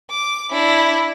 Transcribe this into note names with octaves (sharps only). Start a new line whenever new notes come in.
D6
D4 E4